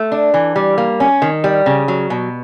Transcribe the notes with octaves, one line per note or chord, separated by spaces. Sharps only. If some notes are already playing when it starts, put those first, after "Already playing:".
Already playing: A3
D4
E3
G3
A#3
C#4
D#3
G3
C#3
F#3
B2